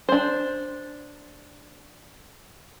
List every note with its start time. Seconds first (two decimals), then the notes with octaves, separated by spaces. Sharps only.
0.09 D4 C5